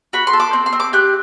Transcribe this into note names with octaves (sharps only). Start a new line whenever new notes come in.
F#4 B5
C6
A4
D6
C4
C6
C4
D6
G4 F#6